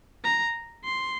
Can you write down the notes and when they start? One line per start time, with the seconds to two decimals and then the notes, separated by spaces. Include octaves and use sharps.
0.24 A#5
0.84 C6